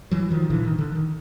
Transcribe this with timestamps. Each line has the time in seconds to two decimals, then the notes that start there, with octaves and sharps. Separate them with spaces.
0.11 E3 F#3
0.30 D#3 F3
0.50 A#2 D3 E3
0.65 D#3
0.79 D3
0.92 D#3